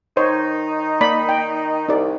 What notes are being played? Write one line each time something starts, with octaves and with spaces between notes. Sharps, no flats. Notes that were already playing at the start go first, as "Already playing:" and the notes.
D#3 D#4 C5 C#5
A#3 D5 B5
G5
C2 D#4 D5